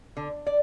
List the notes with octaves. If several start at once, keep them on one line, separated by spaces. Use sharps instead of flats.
D3
D5